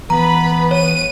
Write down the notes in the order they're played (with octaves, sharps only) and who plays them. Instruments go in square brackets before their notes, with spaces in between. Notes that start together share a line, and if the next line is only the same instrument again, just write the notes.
[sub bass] E3 [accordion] B3 [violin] B4 B5 [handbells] A#5
[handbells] C#5 [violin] D#7